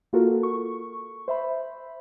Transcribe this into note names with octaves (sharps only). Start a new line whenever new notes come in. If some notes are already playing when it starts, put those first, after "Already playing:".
A#3 F4 F#4 A4 A#4
C#6
C5 E5 B5